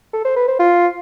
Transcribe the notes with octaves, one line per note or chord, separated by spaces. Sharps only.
A4
C5
B4
C5
F4